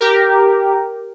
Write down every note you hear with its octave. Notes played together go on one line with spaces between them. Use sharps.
G4 A#4